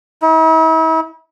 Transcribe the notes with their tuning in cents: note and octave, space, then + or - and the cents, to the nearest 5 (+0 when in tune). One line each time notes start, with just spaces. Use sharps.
E4 -45